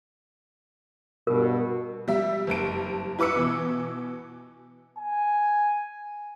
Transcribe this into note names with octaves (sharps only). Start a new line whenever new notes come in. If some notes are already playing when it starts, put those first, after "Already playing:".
G2 B2 A#4
G3 E5
F#1 G2 A5 D7
E4 B4 D6 E6 C#7
B2 E3
G#5